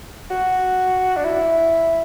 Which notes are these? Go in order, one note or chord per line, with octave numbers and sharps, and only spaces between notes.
F#4
D4
E4